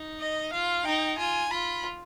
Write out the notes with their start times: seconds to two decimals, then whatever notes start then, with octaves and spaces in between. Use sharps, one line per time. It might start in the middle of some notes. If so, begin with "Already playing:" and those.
Already playing: D#4
0.20 D#5
0.53 F4 F5
0.85 D#4 G5
1.18 F4 G#5
1.51 F4 B5